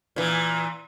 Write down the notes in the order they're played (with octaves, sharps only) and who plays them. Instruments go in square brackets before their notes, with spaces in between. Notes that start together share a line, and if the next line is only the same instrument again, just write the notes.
[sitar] A#2 E3